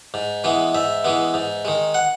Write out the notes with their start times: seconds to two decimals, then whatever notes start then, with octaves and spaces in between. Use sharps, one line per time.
0.14 G#2
0.44 E3 G#3 B3
0.75 G#2 E5
1.04 E3 G#3 B3
1.34 G#2
1.65 D#3 G#3
1.94 F#5